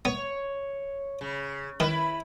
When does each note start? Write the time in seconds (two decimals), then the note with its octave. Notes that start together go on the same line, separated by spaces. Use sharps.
0.05 B3 C#5
1.21 C#3
1.80 D#3 E4 B4